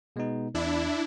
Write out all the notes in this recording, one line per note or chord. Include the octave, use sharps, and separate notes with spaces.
B2 G#3 B3 D#4
E2 D4 E4